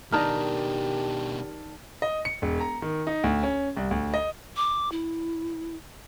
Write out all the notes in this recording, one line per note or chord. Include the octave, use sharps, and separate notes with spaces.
B2 D#3 D4 D#4 G4 D5 A5 F6
D#5
C#7
E1
A#5
D#3
D#4
D2
C#4
C2
D2
D#5
D6
E4